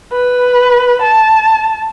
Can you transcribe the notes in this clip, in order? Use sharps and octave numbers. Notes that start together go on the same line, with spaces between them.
B4
A5